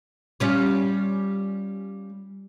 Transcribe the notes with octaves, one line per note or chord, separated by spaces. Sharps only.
G3 C#4 F4